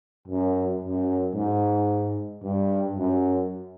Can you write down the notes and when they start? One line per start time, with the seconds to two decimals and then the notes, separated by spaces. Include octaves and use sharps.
0.28 F#2
0.82 F#2
1.35 G#2
2.43 G2
2.96 F#2